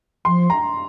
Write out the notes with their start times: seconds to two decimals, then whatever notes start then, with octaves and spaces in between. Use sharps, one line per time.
0.25 F3 C6
0.50 A#5